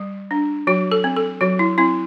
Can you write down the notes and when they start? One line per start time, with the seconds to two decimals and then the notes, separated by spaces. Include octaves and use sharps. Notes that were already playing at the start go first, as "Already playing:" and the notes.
Already playing: G3
0.31 D4
0.67 F#3 F#4
0.92 A4
1.04 C4
1.16 A4
1.41 F#3 F#4
1.59 E4
1.78 C4 E4